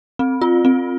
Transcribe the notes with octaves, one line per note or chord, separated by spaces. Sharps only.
C4
F4
C4